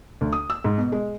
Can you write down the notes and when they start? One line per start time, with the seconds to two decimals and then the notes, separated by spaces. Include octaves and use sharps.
0.21 D2
0.33 D#6
0.50 E6
0.64 G#2
0.78 B2
0.92 G#3